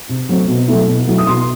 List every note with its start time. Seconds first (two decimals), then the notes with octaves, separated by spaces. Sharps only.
0.09 C3
0.29 F#3 A3 C4
0.48 B2
0.68 F#3 A3 E4
0.87 B2
1.07 F#3 A3 E4
1.18 D#6
1.27 B2 C6